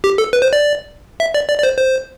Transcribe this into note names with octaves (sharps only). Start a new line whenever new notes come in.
G4
A4
B4
C5
D5
E5
D5
D5
D5
C5
C5